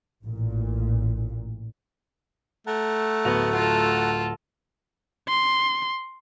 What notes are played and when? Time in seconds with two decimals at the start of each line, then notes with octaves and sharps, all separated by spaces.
0.24 A1 A#2
2.67 A3 F#5 A5 A#5
3.25 D1 B3 F#4 F7
3.55 F4 A4
5.28 C6